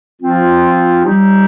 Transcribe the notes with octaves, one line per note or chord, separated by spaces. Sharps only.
F3 C4 F4
G3 D#4 G4